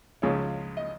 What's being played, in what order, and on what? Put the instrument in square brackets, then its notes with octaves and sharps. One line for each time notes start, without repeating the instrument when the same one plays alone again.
[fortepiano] C#2 C#3 F3 G#3 C#5
D#5